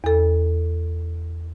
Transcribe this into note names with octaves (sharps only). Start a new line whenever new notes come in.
E2 A4